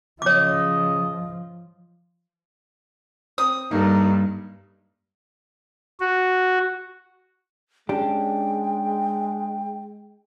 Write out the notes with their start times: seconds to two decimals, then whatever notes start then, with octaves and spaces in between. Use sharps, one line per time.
0.22 C#3 F3 C#5 D#5 D6
3.38 C4 D#6
3.71 G2 A#3 D#4 A4
6.00 F#4
7.89 G#3 C#4 D4 G4 G5